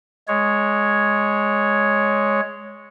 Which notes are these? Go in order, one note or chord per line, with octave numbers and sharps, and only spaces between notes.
G#3 C#5